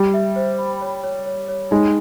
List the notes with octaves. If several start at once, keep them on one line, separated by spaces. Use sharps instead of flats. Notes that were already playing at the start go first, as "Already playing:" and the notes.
Already playing: G3
E5
C5
B5
C#5
C#5
C#5
C#5
G#3 D#4